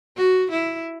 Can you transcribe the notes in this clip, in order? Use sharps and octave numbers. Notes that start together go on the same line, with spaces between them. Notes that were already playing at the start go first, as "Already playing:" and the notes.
F#4
E4